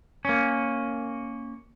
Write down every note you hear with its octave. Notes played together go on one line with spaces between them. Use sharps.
A#3 C#4